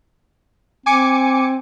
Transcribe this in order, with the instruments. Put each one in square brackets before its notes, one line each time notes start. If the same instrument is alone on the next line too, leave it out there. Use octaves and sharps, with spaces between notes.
[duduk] C4 [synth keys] G#5 D6 C#7